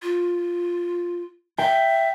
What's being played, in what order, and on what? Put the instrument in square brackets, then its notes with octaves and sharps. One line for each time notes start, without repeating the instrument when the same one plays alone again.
[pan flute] F4
[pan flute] E5 [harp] G5